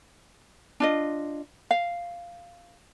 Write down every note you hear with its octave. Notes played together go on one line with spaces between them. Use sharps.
D4 F4 D#5
F5